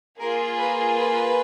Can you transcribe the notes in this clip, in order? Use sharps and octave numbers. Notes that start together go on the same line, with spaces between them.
A#3 F4 G#4 A#4
B4
B4